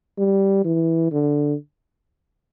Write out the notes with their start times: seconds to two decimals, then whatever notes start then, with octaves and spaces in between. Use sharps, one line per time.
0.18 G3
0.65 E3
1.12 D3